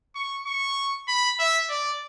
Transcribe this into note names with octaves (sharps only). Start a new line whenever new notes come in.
C#6
C#6
B5
E5
D5